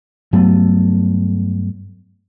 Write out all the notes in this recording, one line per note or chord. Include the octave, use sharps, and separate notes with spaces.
G2 F#3 A3 B3